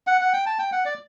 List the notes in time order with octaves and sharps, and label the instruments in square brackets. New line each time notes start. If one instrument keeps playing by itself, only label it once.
[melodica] F#5
F#5
G5
A5
G5
F#5
D5